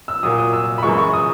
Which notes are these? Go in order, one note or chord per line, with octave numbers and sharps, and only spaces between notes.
E6
A#2 F#3 D#6
D#6
E6
B5
F#2 E3 G#3 C#6
C#6
D#6